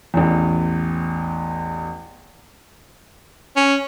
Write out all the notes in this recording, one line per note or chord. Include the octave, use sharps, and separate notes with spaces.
A1 E2
C#4